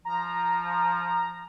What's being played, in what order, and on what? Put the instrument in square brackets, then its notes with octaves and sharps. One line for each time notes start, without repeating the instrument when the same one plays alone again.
[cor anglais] F3 [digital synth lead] A#5